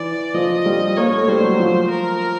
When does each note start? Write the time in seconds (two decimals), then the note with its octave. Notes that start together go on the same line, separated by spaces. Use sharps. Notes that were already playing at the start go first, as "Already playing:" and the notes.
Already playing: E3 D5
0.34 F3 D#5
0.66 G3
0.97 A#3 C#5
1.13 A3
1.28 G3 C5
1.44 F#3
1.59 F3
1.90 A#4